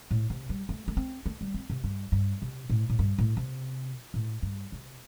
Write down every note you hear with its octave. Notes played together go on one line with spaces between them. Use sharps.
A2
C3
G3
A3
A3
C4
A3
G3
C4
C3
G2
G2
C3
A2
A2
G2
A2
C3
A2
G2
C3